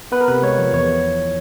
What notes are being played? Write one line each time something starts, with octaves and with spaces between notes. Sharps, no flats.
B3 B4
A#4
C3 B4
G#3 C#5
F3
E2 C#5